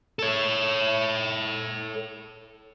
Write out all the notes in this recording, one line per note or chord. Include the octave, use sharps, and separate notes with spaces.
A4 C#5